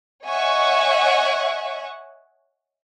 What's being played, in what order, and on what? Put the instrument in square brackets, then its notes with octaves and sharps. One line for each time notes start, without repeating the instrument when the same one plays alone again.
[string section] C#5 D#5 E5 F#5 G#5 C#6